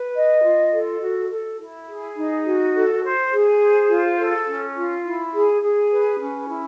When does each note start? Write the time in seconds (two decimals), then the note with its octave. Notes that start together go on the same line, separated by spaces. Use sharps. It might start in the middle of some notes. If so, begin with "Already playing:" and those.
Already playing: B4
0.15 D#5
0.43 F4
0.72 A4
1.01 F#4
1.30 A4
1.58 E4
1.88 G#4
2.16 D#4
2.45 F#4
2.74 A4
3.03 C5
3.31 G#4
3.60 C5
3.89 F4
4.18 A4
4.46 C#4
4.76 F4
5.04 E4
5.33 G#4
5.62 G#4
5.91 B4
6.19 C#4
6.48 E4